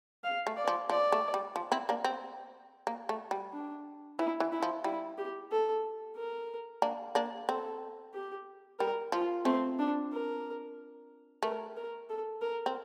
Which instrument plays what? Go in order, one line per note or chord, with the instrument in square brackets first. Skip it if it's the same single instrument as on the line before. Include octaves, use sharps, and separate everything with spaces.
[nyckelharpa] F5
[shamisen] A3
[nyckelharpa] D5
[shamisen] F3
[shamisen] F3 [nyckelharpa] D5
[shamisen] A3
G3
F3
C4 E4
A#3 D4
C4
A#3
A3
G3
[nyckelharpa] D4
[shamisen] E3 [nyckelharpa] E4
[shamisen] E3
[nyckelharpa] E4
[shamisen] F3
[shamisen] G3 [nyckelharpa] E4
[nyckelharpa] G4
A4
A#4
[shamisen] A#3 D4
A#3 D4
[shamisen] C4 [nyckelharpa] A4
[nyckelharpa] G4
[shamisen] G3 [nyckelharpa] A#4
[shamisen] F3 [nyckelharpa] F4
[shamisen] A3 [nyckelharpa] C4
[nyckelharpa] D4
A#4
[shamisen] A3 [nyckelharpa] A#4
[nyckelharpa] A#4
A4
A#4
[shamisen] C4